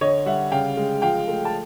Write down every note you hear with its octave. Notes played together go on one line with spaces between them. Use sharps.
D3 C#5 D#5
G3 E5 F#5
C#3 F5 G5
G#3
F3 F5 G5
A3
A5